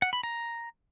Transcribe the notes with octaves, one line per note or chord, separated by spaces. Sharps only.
F#5
B5
A#5